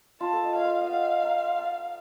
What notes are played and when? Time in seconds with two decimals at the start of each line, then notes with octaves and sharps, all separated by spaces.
0.21 F4 A5
0.33 A4
0.43 D#5
0.55 C#5 F5
0.64 C5
0.81 D#5
0.90 F5 F#5
1.23 A#5
1.58 A5